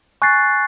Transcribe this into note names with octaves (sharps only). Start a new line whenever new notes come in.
G#5 C#6 F#6 A6 C7